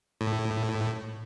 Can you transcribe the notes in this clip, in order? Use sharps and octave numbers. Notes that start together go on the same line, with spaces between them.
A2